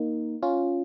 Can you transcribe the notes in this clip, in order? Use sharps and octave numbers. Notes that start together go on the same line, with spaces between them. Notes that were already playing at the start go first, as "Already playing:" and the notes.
Already playing: A#3 D#4
C#4 F4